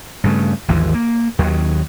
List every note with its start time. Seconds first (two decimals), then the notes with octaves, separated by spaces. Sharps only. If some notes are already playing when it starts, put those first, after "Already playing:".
0.24 G2 C#3 A3
0.68 G#1 D#2 E3 F3
0.94 A#3
1.39 D#2 D#3 F#3